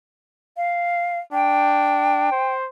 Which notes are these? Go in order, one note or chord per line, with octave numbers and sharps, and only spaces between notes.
F5
D4 G5
C5